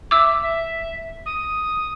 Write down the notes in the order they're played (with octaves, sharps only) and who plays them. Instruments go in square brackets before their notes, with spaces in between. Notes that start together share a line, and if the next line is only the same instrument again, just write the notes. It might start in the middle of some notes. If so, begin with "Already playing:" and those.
[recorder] E5 [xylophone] D6 E6
[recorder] E5
D#6